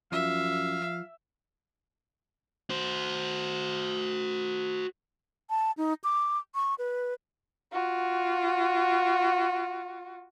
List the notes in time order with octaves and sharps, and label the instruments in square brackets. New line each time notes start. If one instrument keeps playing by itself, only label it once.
[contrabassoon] F#2 [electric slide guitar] F3 [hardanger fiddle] E5 [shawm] F5
[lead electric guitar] F#4 C5
[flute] A5
D#4
D6
C#6
B4
[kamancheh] F4 F#4